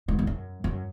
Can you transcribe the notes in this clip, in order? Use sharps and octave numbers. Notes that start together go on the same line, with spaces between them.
G#2
E2
F#2
F#2